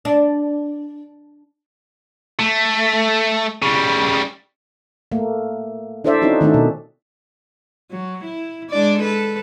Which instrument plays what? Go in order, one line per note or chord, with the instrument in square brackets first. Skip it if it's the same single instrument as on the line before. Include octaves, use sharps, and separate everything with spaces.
[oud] D4
[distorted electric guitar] A3
C#3 G3
[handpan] A3 A#3
D4 E4 A4 C5 D5 E5
C4 C#4 D#4 E4 F#4
D#3 A3 C4 D4 D#4
B2
[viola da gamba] F#3
E4
G#3 D4 D5
A4 B4